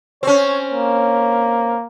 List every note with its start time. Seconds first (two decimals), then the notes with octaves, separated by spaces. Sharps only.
0.23 C4 C#4 C#5
0.72 A#3